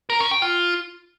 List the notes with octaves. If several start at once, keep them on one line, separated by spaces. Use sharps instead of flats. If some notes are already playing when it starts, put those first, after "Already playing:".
A#4
C#4
G5
F4